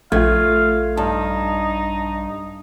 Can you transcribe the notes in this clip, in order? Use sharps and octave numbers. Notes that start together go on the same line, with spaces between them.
A#1 A3 F4 F5 G#6
G2 D#4 A5